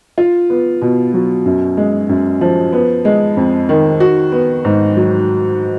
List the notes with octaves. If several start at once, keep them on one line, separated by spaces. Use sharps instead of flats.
F4
B3
B2
F#3
F#2
G#3
F#2
F3
B3
G#3
F2
D#3
F#4
B3
G#2
F#3